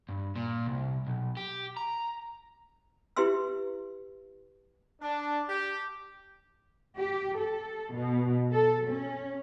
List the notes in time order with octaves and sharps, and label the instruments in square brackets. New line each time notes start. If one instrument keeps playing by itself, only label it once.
[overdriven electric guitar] G2
A#2
C2
B1
G4
A#5
[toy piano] E4 G4 B4 E5 C6 E6
[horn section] D4
G4
[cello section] G4
A4
B2
A4
C#4